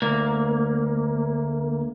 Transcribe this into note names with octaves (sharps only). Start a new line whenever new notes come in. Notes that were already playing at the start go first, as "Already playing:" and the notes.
D2 A#3